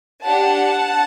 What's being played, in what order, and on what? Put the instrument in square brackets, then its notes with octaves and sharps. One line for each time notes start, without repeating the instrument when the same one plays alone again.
[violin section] D4 G4 F#5 A5